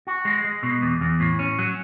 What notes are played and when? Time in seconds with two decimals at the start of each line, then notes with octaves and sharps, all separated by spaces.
0.07 F#4
0.25 G#3
0.44 G#3
0.63 B2
0.82 E2
1.01 E2
1.20 A2
1.39 C#4
1.59 F#3